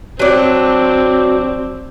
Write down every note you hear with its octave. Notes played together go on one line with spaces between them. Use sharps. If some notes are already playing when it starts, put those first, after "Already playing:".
F#3 C4 D4